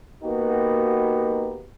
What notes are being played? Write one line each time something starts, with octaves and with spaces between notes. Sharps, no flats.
A#3 B3 D#4 F#4 G4